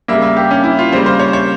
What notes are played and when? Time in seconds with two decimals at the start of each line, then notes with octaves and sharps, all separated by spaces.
0.08 C#3 G3 A#3 E5
0.22 E5
0.37 G4
0.51 C#4
0.64 E4
0.79 F4
0.92 C#3 G3 A#3 C5
1.06 C5
1.19 C#5
1.33 C#5